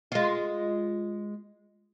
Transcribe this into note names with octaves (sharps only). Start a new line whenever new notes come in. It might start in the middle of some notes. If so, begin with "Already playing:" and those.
G#3 F4